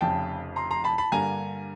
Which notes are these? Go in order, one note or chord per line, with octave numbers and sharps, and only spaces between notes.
F1 F2 C#3 G5 A5
A#5 C6
A#5 C6
A5 B5
A5 B5
G2 D3 G3 A#3 G#5 A#5